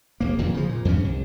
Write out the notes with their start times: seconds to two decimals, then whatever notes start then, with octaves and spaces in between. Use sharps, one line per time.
0.20 E1 A#3
0.38 D1 F2 A#2
0.54 C#3 F3
0.69 A#2
0.85 E2 G2 E3 C#4
1.04 C2